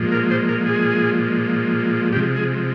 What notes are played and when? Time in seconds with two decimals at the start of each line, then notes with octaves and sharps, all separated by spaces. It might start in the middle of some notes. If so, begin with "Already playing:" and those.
Already playing: A#2 F3 G#3
0.12 A#4
0.31 C5
0.48 A#4
0.66 G#4
2.12 C3 F3 G#3 G4
2.36 G#4